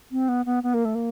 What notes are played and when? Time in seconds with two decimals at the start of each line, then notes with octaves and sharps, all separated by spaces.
0.12 C4
0.29 B3
0.46 B3
0.63 B3
0.74 A#3
0.85 A3
0.95 A#3